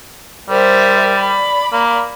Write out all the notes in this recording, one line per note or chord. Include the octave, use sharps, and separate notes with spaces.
G3 A#4 C5 E5
D5 B5
A#3